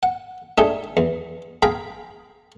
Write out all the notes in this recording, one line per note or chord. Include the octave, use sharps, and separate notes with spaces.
F#5
A3 D4 D#4 G4 G#4
E2
G#4 F5 G5 A#5 B5